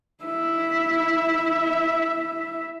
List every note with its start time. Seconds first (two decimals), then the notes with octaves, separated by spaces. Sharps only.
0.24 E4 E5